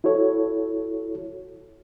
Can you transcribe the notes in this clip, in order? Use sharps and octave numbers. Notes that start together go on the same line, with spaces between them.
E4 F#4 A4 C#5